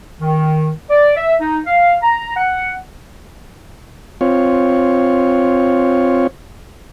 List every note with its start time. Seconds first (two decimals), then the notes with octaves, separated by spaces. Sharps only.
0.21 D#3
0.90 D5
1.16 E5
1.40 D#4
1.66 F5
2.02 A#5
2.37 F#5
4.21 C4 F4 C#5